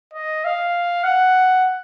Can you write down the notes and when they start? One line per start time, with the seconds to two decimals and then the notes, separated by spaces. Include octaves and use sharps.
0.13 D#5
0.45 F5
1.04 F#5